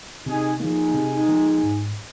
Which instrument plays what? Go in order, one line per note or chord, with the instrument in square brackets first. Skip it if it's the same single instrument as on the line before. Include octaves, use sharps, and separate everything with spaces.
[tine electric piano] C3 [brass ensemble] D#4 G#4
[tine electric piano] F3 A#3 [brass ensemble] D#4 G#4
[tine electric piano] C3
F3 A#3
G#2